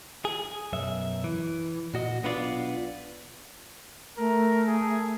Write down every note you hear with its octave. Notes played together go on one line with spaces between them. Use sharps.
G#4
B1 F#2 E5
E3
A#2 F#4 D#5
B1 B3 D4 E4 F4 D5
A3 A#4
G#4